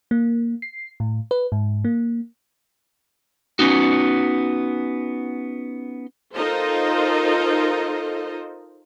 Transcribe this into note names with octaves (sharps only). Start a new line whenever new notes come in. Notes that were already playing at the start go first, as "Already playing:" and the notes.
A#3
C7
A2
B4
G#2
A#3
B3 C#4 D#4 F#4
D#4 F4 A4 A#4 C5 D#5